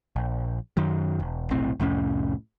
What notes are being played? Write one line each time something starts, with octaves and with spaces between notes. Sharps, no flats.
A#1
F#2 D#3 F#3
E1
F1 B1 A2 C4
C2 F2 A2 C#4